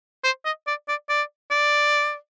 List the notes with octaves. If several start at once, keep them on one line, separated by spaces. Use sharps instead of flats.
C5
D#5
D5
D5
D5
D5